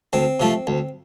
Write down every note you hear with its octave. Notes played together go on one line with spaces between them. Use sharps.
D2 C4
C3 F3 A3
D2